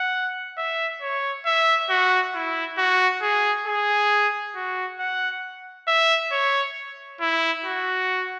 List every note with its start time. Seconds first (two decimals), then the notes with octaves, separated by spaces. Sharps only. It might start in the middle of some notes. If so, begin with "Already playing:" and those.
Already playing: F#5
0.57 E5
1.01 C#5
1.46 E5
1.89 F#4
2.34 E4
2.77 F#4
3.22 G#4
3.66 G#4
4.55 F#4
4.99 F#5
5.88 E5
6.32 C#5
7.21 E4
7.64 F#4